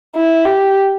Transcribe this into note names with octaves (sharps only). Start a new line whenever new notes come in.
E4
G4